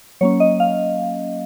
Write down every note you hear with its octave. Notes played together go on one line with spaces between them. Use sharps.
F#3 A#3 C#4 C#5
D#5
F5